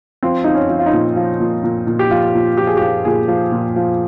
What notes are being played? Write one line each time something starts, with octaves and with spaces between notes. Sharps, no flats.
F3 C4
F3 D#4
C#4
F3
F4
D#4
A#2
F3
A#2
A#2
A#2
G4
F3 F4
A#2
F3 G4
G#4
F3 G4
A#2 G#4
F3
A#2
F3